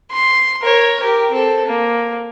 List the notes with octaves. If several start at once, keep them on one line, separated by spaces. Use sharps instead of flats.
C6
A#4 C#5
G4 A#4
C4 A4
A#3